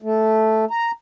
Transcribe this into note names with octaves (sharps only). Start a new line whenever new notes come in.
A3
A#5